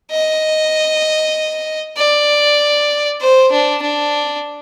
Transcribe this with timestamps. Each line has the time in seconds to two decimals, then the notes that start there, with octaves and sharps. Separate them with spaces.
0.11 D#5
1.96 D5
3.21 C5
3.52 D4
3.82 D4